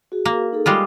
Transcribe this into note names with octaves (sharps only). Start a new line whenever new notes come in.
F#4 G#4
A#3
D#4 G#4 A4
G3 G#3 F4 B5 D6 D#6